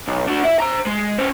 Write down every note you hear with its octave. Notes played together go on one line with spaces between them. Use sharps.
B1
D4 F#4
E4 E5
C5 A#5
G#3
C#4 C5